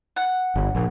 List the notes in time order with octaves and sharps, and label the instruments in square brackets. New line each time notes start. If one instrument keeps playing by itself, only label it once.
[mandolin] F#5
[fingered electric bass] G1
A#1